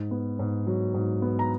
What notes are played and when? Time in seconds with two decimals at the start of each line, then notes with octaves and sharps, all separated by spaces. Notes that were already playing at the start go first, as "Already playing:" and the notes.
Already playing: G#2
0.11 B3
0.39 G#2
0.67 F#3
0.94 G#2
1.22 B3
1.39 A#5